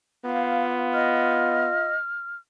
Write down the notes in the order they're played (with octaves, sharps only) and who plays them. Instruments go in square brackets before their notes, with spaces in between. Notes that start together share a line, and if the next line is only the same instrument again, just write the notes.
[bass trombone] B3 [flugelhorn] F4 [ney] F5
[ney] D#5 [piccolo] F6